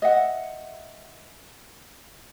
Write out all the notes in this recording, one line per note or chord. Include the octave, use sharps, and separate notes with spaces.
D#5 E5 F#5